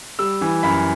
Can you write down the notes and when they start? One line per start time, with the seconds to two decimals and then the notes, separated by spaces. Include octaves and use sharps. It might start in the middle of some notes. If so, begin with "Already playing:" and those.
0.19 G3 E6
0.41 E3
0.63 F#2 B5